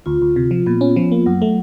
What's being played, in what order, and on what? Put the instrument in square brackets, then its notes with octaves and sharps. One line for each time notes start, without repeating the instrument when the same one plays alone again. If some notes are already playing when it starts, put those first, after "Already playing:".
[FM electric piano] D2 [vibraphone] F4
[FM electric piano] D2
C3
F3
[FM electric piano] A#2 [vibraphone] B3
[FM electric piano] C#4
F3
A#3
[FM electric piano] F#2 [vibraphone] F#3
[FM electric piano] A3